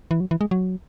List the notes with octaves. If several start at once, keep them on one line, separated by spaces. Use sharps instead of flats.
E3
F#3
E3
G#3
F#3